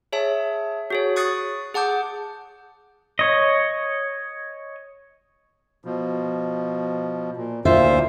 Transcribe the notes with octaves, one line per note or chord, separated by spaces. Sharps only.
G#4 C#5 E5 A5
F#4 G#4 C#5
C#6 D#6 F#6 A6 C7
G#4 F#5 A5 D6 G6
C#5 D#5
B2 F3
A#2
D2 A#2 F4 C5 E5